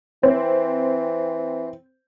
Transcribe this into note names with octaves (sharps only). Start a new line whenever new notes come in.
E3 C4